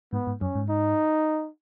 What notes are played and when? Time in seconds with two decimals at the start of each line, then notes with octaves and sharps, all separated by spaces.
0.13 G#2 B3
0.27 G#2
0.41 F#2 C#4
0.55 G#2
0.69 D#4